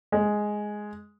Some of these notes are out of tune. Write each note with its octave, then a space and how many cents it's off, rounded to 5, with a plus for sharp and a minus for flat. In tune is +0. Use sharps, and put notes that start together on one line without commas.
G#3 +5